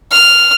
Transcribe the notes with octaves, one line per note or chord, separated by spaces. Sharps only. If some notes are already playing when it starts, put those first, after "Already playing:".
F6